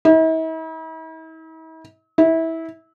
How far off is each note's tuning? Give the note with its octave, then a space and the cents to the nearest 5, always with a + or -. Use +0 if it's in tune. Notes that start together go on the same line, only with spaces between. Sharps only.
E4 -45
E4 -20